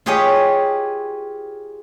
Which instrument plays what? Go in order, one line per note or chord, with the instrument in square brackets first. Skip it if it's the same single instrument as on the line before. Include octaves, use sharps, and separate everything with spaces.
[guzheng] F4 G4 G#4 B4 C#5 D#5